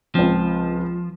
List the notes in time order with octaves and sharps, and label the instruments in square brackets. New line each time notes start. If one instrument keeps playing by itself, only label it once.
[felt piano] C#2 C4 [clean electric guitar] F3